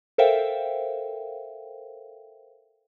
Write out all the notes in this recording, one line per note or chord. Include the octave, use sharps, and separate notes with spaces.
A4 A#4 C5 E5 F5 G5